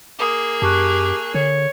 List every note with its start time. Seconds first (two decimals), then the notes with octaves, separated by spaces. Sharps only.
0.19 A#3 G#4 D6 D#6
0.62 F#2 G4 A5 C#6 F#6
1.34 D3 C#5